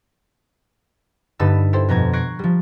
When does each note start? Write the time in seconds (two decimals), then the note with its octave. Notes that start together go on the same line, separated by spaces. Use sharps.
1.39 G2 D3 D#4 B4 A5 E6
1.73 E4 G4 A4 C5
1.89 F2 B2 A#5 G#6
2.13 C#6 F#6 G#6 A#6 C7 D7
2.39 F3 G3